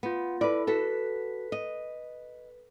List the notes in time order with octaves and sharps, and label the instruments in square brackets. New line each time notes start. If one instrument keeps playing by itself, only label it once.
[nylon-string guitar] B3 [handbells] F4 F#5
[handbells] E4 A4 [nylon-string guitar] B4 D5
[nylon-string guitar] F#4 A4 [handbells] B4 B6
[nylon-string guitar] D#5